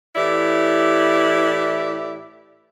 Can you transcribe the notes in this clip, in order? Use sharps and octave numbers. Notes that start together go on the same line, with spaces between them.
A2 E3 E4 G4 D5